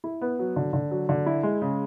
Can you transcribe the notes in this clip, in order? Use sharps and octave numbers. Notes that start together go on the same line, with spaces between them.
E4
B3
F#3
D3
D3
F#3
D3
E4
G#3
C#3